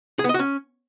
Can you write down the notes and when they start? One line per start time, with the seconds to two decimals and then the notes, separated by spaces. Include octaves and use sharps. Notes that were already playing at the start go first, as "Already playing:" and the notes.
0.19 G#4
0.24 B3
0.29 D#5
0.34 F#4
0.39 C#4